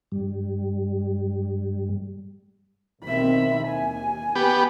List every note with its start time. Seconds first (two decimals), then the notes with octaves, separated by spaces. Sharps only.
0.12 G2 G3
3.04 B1 D#3 C4 E5 B5
3.67 D#2 G#5
4.35 B3 G4